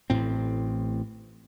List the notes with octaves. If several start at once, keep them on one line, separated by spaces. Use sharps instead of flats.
A1 A2 C4